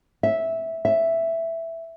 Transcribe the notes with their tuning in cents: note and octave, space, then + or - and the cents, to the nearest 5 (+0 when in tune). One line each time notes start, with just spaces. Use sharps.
E5 -10
E5 +5